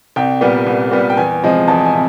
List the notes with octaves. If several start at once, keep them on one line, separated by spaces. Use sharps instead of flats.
C2 G5
A#2 G3 B3
C2
A#2 G3 B3
G5
E2 G#5
C3 F3 G#3
E2 A5
G#5
C3